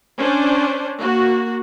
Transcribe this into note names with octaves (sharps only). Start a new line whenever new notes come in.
C#4 D4 C5
A#3 F#4